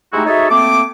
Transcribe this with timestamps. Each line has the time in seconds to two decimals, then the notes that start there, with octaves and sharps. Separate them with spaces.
0.13 G#3 A3 D#4 E4 F#4 G4
0.26 D#4 F#4 G#4 A4 C#5 E5
0.51 A3 A#3 C4 D6